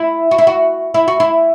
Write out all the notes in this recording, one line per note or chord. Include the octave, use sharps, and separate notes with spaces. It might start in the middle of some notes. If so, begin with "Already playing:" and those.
Already playing: E4
F#4
E4
F#4
E4
F#4
E4